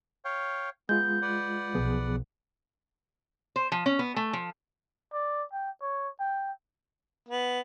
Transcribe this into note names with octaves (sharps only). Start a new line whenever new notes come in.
C#5 F5 G5
G#3 B3 F4 G6
B4 D5 F#5
B1 F3 B3 G#4
C5
F3
C#4
B3
A3
F3
D5
G5
C#5
G5
B3